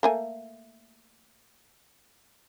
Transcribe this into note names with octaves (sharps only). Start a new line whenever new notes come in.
A3 A#3 G#5